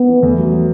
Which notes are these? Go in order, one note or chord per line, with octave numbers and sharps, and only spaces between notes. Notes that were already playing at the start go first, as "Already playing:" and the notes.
Already playing: B3
E3
E2 A3
F#3
F#3